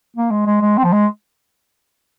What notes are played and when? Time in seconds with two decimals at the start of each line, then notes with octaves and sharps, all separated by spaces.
0.16 A#3
0.31 G#3
0.46 G#3
0.62 G#3
0.77 C4
0.84 F3
0.92 G#3